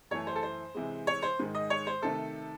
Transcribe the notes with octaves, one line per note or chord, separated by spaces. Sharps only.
F#2 E3 A3 C#5
C5
A4
C5
C3 E3 G#3
C#5
C5
G#2 D#3 G#3
D#5
C#5
C5
C3 D#3 A3 A4